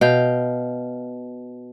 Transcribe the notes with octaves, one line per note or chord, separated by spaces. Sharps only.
B2 F5 G5